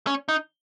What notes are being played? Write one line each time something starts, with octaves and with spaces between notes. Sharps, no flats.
C#4
D#4